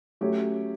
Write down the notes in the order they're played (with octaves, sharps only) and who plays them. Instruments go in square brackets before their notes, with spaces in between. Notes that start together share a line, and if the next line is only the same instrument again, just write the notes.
[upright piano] F#3 C#4 G4 C#5 [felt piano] A3